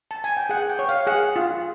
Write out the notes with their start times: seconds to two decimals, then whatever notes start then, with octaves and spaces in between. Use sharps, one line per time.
0.11 A5
0.24 G#5
0.37 G5
0.49 G#4 F#5
0.70 G5
0.79 C#5
0.89 F5
1.07 G#4 F#5
1.36 F4